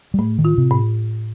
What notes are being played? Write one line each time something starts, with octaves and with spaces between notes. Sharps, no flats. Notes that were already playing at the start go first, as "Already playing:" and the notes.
G3
A2 A3
D#3
F4
C3
A2